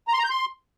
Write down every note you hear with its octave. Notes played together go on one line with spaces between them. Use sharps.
A#5
C6
A#5
G6
C6